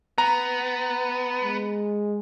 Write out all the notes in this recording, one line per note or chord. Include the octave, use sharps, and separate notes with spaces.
B3 A#5
G#3